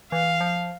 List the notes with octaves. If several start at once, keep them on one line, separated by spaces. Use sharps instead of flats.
E3 F5
F3